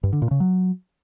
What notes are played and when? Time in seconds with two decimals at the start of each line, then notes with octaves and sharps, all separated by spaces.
0.03 G2
0.13 D3
0.22 A#2
0.31 C#3
0.40 F#3